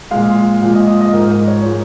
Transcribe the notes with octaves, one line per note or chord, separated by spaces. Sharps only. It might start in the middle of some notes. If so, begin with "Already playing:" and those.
A#2 F3 G#3 F5
A#2 F3 G#3 F5
D#5
D#5
D#5
G#2 F3 G#3 A#4
A#4
C#5
F3 G#3